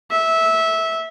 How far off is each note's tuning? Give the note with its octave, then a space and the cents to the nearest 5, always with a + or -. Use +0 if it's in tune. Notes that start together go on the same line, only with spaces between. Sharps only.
E5 -15